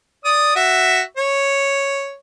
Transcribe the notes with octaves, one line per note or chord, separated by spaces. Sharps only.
D5 D#6
F#4 E5
C#5